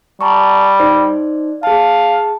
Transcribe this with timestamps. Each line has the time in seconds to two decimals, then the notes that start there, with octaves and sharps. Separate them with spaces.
0.21 G3 A5 A#5 C#6
0.79 D#4 C5 D5
1.63 G#4 F5 A5